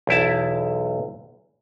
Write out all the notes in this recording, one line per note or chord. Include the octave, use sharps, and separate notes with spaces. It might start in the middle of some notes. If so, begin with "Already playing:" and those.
B1 E2 E4 A5